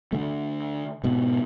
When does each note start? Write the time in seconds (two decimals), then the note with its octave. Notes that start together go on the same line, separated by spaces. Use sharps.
0.13 D3 A3
1.04 G#2 B2